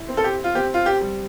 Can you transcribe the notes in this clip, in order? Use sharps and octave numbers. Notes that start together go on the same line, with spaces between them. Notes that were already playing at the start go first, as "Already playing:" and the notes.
Already playing: E4
C4
A4
G4
F4
C4 G4
F4
G4
G3